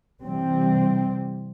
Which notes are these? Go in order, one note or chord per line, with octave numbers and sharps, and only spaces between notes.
C3 E3 G3 C4